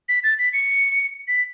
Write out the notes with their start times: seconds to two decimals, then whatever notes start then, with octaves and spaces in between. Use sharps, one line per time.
0.09 B6
0.24 A6
0.39 B6
0.53 C#7
1.28 B6